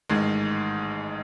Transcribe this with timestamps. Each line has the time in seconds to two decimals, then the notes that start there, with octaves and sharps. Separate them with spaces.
0.09 A1 G#2 D#3 G#3